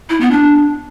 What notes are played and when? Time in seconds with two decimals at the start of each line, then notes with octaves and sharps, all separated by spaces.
0.10 E4
0.21 B3
0.32 D4